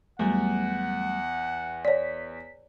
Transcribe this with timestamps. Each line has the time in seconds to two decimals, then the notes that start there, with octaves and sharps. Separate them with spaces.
0.19 E2 F#3 G3 A3 F#5
1.85 C#5 D5 B6